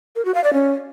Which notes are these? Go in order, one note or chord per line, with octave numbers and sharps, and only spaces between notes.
A#4
F#4
F5
D5
C#4